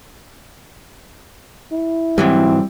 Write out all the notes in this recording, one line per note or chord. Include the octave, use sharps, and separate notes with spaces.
E4
G#2 E3 F#3 G3 C4